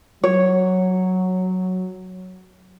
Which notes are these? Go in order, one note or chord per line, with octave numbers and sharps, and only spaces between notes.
F#3 C#5